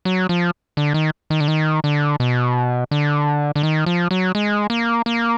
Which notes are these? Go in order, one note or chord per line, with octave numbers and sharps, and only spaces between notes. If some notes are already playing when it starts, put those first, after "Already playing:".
F#3
F3
D3
D#3
D#3
D3
D#3
D3
B2
D3
D3
D#3
F3
F#3
G#3
A#3
A#3